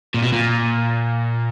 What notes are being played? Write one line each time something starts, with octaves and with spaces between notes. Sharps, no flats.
A#2
B2
A#2